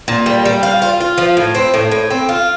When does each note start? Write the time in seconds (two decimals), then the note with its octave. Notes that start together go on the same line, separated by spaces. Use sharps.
0.08 A#2
0.26 G3
0.45 G3
0.63 F4
0.82 F4
1.00 F4
1.18 F3
1.37 A2
1.55 C4
1.74 A2
1.91 A2
2.10 C4
2.29 F4